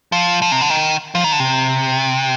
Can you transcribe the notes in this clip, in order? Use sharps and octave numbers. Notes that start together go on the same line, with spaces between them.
F3
F3
C3
D3
D#3
F3
D#3
D3
C3